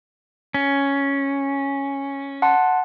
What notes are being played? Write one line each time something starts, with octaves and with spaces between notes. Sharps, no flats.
C#4
F#5 A5 C6